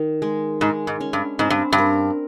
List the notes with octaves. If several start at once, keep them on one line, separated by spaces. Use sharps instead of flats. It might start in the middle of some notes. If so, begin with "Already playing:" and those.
Already playing: D#3
G#3
G#2 G#3
G#2
C#4
G2
G#2 C4
G2
G2
A#4